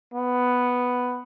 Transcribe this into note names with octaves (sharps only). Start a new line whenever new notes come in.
B3